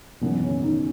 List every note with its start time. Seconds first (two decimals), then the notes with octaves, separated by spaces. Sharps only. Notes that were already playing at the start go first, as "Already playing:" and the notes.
0.21 G#1 F#2 B2 E3 B3
0.42 C#3 C#4
0.63 D#3 D#4